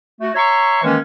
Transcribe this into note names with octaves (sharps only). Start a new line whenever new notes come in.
A3 F#4
C#5 E5 A#5 C6 C#6
D#3 E3 G#3 A#3 C#4